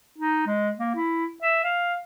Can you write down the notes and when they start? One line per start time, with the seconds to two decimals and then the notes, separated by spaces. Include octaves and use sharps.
0.19 D#4
0.47 G#3
0.79 A#3
0.95 E4
1.43 E5
1.64 F5